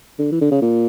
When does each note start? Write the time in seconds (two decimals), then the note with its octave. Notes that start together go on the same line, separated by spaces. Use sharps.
0.19 D3
0.32 E3
0.41 D3
0.52 C#3
0.62 A#2